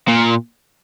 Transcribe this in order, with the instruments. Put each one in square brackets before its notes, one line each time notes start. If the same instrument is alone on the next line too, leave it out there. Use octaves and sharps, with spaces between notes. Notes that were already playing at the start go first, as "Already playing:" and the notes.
[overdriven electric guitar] A#2